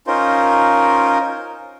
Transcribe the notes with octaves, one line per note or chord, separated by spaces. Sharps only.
C#4 D#4 F4 A#4 C5